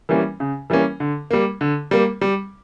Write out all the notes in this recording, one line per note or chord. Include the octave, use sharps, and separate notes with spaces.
E3 G3 A#3 C#4
C#3
E3 G3 A#3 C#4
D3
G3 A#3
D3
G3 A#3
G3